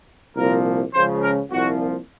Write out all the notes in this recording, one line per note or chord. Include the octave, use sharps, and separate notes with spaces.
C2 A#2 F3 A#4
C#2 C#3 F3 C5
A#4
C2 A#2 F3 F#4